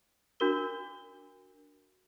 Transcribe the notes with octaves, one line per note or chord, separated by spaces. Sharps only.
D4 F#4 A#4 G7